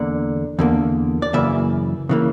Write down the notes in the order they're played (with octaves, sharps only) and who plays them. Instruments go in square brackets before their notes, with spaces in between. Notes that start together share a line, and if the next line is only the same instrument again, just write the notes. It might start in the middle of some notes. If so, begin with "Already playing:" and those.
Already playing: [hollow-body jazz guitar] E2 D3 A#3 D5
E2 D3 A#3
D5
F#2 C#3 E3 A#3 E5
C#3 E3 A#3